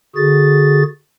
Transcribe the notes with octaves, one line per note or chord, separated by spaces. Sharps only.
D3 F#4 G#4 A6